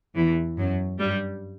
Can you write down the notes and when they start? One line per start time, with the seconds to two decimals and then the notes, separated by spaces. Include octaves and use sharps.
0.16 E2 E3
0.58 F#2 F#3
0.99 G2 G3